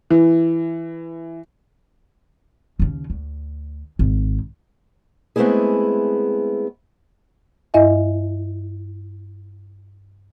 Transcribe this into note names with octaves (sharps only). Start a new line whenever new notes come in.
E3
D#2 C#3
D2
G#1
G#3 A3 B3 C4 E4 G#4
G2 E4 D#5 E5 G#5